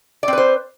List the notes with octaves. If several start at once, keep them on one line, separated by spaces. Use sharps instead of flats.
C4 B4 C5 D5